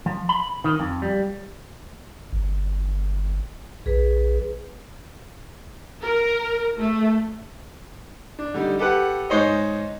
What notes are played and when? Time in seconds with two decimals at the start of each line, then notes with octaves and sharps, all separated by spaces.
0.06 F3
0.29 B5
0.64 D#3
0.80 F2
1.02 G3
2.33 G1
3.86 A#1 G#4 B4
6.02 A#4
6.78 A3
8.39 D4
8.54 D3 G3 D#4
8.79 G4 A4 B4 F#5
9.30 G#2 D#4 C5 C#5 D#5